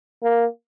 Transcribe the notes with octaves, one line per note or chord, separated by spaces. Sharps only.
A#3